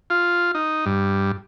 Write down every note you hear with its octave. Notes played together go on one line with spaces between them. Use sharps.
F4
D#4
G2